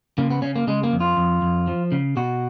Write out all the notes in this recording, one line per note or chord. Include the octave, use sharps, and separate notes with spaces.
C#3 A#3
B3
C#3 C#4
A#3
C#3 G#3
A#3
F2
F4
F2
F2
F3
C#3
B2 F#4